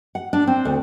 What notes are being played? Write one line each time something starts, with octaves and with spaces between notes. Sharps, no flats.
F#5
D4
C4
D2